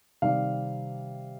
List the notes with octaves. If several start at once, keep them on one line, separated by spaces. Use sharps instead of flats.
C3 D#3 G3 F5